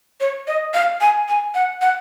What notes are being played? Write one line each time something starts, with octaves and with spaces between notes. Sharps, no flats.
C#5
D#5
F5
G#5
G#5
F#5
F#5